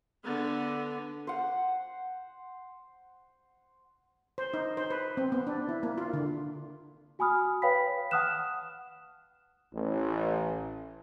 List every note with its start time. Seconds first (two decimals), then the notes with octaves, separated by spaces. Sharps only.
0.24 D3 B3
1.27 C5 F#5
4.38 C5
4.54 D#4
4.77 C5
4.90 B4
5.17 C4
5.32 B3
5.47 D4
5.69 E4
5.83 A#3
5.98 F4
6.13 D3
7.19 F#4 G#5 B5 D#6 F6
7.62 B4 C#5 F5 G5 B5 B6
8.11 F#5 A5 D#6 F6 F#6 E7
9.73 A1